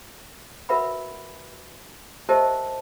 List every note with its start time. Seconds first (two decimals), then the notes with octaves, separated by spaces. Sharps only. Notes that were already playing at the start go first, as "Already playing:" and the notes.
0.69 F#4 A#4 B4 E5 F#5 B5
2.29 G4 A#4 C5 D#5 E5 A5